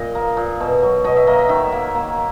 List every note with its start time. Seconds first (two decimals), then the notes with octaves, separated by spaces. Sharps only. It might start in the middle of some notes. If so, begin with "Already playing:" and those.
Already playing: A#2 D#5
0.15 A#3
0.37 A#2
0.60 B2
0.82 F#3
1.04 B2 D#5
1.17 E5
1.27 A#3 D#5
1.39 E5
1.49 D#3 E5
1.72 A#3
1.95 A#3